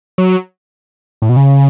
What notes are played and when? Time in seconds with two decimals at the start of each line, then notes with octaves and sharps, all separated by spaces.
0.18 F#3
1.22 A2
1.29 B2
1.36 C#3